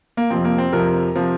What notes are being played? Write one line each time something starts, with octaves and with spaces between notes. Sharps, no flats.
A#3
F2 C3 F3 C4
A#3
C4
F2 C3 F3 A#4
C3 F3